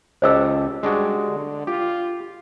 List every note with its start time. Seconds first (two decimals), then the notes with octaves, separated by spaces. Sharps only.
0.22 C#2 G4 A4 C5 D#5 E6
0.83 G3 G#3 D4 F#4
1.28 D3
1.67 F4 G4